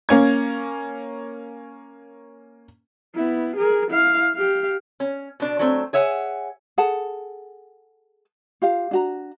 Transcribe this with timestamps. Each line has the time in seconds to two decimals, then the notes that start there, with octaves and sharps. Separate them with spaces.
0.09 A#3 C#4 G#6
3.15 B3 E4
3.56 G#4 A#4
3.91 E4 F5
4.34 G4 F5
5.00 C#4
5.40 B2 D4
5.59 F#3 A3 C4
5.93 G#4 C#5 E5 F#5 G#5
6.78 G#4 A4 F#5 A5
8.62 F4 G4 F5
8.91 D4 F#4 A#5